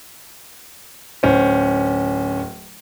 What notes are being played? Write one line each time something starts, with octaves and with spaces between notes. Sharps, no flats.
D1 C#4 C5